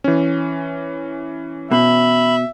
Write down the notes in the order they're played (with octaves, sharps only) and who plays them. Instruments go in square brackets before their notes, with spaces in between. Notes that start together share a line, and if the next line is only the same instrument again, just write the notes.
[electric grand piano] E3 C#4
[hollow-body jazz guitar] B2 [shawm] E5 [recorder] B5